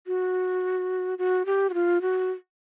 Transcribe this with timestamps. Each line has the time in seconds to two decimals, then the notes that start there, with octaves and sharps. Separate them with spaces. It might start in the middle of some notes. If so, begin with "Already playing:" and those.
0.07 F#4
1.18 F#4
1.46 G4
1.70 F#4
1.74 F4
2.02 F#4